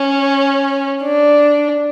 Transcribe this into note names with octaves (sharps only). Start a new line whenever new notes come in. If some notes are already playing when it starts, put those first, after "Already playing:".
Already playing: C#4
D4